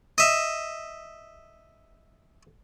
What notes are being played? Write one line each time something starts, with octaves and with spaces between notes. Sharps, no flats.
D#5 E5